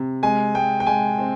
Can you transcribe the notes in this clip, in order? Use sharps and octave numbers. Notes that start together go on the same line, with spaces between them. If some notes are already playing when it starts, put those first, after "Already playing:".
Already playing: C3
G#3 G#5
G#3 G5
G5
G#3 G#5
C4